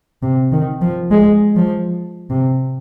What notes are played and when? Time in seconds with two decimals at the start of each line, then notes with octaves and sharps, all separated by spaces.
0.23 C3
0.52 D#3
0.82 F3
1.11 G#3
1.56 F3
2.30 C3